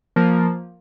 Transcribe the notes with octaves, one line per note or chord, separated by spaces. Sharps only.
F3 A#3